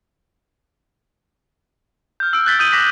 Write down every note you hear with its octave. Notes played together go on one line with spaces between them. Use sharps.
F6 G6
E6 D7
F#6 G6 A6 B6 G7
D#6 G6 D#7 F#7 G7
D6 A#6 B6 F#7